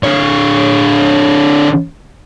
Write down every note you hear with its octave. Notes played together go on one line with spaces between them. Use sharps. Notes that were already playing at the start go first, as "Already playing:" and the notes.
D3 C#5